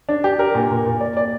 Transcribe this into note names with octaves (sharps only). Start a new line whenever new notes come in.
D4
G4
A#4
A#2
A#2
A#2
D5
D5